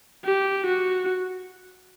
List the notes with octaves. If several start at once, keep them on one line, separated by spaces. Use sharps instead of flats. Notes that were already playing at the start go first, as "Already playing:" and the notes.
G4
F#4